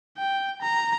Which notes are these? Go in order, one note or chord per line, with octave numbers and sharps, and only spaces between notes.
G5
A#5